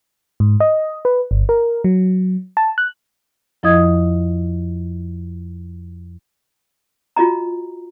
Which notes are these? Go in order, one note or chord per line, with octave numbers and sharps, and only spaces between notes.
G#2
D#5
B4
G1
A#4
F#3
A5
F#6
F2 F3 E4 D#5 D#6 G#6
F4 F#4 D#5 A#5